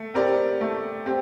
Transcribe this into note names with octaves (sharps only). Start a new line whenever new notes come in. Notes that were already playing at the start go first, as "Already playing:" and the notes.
Already playing: A3
C4 G4 A#4 D5
A3
C4 G4